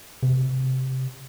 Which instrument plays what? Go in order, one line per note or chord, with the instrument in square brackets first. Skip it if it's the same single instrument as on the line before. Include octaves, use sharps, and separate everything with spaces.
[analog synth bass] C3